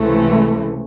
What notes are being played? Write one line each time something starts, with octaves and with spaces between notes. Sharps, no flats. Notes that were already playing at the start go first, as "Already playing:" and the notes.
Already playing: C#2 C3 E3 A3